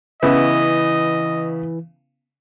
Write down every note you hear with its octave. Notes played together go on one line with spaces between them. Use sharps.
C#3 E3 B3 E4 D#5